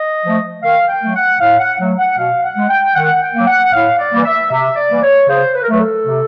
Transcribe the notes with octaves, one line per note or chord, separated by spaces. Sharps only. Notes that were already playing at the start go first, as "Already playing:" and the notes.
Already playing: D#5
F3 A3
D#3 F5
G5
F#3 A3
F#5
A2 F5
F#5
F#3 A3
F#5
B2 F5
F#5
G#3
G5
D#3 F#5
G5
F#3 A#3
F#5
A2 F5
D5
E3 G3 A#3
E5
C3 E5
D5
E3 G3 A#3
C#5
C#3 C5
B4
A#4
F#3 A3 B4
A4
C3